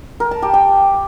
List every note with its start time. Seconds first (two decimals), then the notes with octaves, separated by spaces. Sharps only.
0.20 A#4
0.31 A5
0.42 G4
0.54 G5